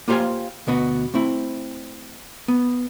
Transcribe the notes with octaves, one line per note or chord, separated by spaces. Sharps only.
A#3 F4 G4 C5 F5 G#5
D2 B2 B3 F#4 D#5
A3 C4 E4
B3